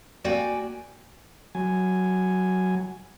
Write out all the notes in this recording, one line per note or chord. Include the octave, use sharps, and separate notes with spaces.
A#3 F#4 D5 G5 G#5
F#3 G#5